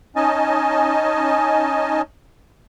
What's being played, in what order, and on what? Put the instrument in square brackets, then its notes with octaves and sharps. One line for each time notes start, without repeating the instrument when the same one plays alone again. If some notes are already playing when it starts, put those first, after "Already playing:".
[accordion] C#4 D#4 D#5 G#5 A5